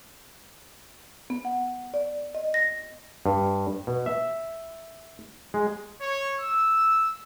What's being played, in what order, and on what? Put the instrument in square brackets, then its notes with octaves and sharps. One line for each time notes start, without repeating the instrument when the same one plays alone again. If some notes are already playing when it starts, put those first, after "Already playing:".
[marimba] B3
F#5
D5
D#5
A#6
[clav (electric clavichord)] G2
B2
E5
G#3
[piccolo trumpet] C#5
E6